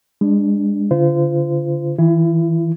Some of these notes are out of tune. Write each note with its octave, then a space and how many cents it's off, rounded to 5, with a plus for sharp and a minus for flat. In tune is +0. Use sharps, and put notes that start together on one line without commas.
G#3 -30 D4 +0
D3 -40 F4 -30 C5 -35
E3 -30 E4 +35